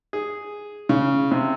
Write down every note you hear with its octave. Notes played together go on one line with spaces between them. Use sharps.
G#4
C#3
C3